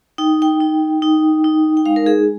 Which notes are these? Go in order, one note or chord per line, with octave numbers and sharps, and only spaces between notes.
D#4 G5
G5
D#4
D#4
D#4
G5
G#3 F5
A#4
G#4